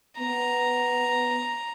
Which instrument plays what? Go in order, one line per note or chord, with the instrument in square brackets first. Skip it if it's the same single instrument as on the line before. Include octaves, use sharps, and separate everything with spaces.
[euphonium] B3 [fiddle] A#5